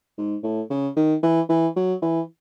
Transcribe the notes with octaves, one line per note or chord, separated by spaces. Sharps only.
G#2
A2
C#3
D#3
E3
E3
F#3
E3